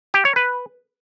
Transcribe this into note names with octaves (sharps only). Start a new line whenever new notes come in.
G4
C#5
B4